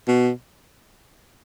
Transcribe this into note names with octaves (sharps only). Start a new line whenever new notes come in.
B2